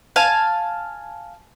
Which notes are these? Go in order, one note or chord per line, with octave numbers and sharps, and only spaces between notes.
F5 G#5 A5